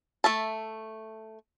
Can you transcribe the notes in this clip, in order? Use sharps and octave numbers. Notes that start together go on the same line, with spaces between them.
A3 E5 A5